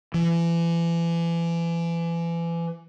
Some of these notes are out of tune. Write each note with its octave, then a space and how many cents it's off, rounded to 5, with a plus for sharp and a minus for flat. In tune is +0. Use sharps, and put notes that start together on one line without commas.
E3 +35